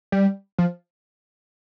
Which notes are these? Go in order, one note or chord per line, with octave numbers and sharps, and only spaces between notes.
G3
F3